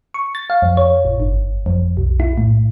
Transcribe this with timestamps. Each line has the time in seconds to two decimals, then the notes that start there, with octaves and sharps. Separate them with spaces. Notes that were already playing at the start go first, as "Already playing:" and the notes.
0.14 C#6
0.35 A6
0.50 F5
0.62 F2
0.77 C#5
1.05 A1
1.20 G1
1.66 F2
1.97 B1
2.20 E4
2.38 A2